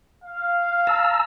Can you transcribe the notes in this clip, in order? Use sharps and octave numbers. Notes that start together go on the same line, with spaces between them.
F5
A5 A#5 E6